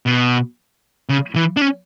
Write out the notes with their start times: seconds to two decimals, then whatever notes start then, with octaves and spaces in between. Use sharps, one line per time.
0.06 B2
1.09 C#3
1.36 E3
1.57 D4
1.61 C#4